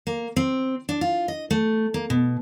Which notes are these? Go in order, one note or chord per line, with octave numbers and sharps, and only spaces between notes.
A#3
C4
D4
F4
D#5
A3
A#3
B2